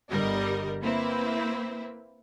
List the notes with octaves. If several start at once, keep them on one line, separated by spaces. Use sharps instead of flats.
G1 D3 G3 A#4 D#5
A#3 C4 E4 B4